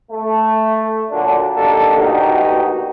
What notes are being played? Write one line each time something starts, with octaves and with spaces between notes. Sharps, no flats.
A3
A#2 D3 F#3 D4
G3 A#3 D4 D#4 G4 A4
A1 D2 A#2 D#4 F#4 G4